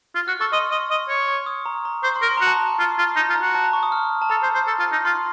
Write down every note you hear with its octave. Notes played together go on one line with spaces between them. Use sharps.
F4
F#4 F6
A4 C#6
D#5 C6
D#5
D#5
C#5
C#6
D#6
A#5
A#5
C5 C#6
C6
A#4
C6
F#4 A#5
A5
A#5
F4
F4
D#4 A#5
F4
A#5
F#4
A5
A#5
C#6
D#6
F6
A5
A4 A#5
C5
C5
A4
F4
D#4
F4 C6